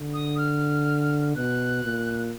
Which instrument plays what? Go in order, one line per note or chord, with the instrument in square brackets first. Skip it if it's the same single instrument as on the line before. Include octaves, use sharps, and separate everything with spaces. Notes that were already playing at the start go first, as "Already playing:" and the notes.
Already playing: [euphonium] D3
[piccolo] D#6
F6
[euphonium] B2 [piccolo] F#6
[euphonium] A#2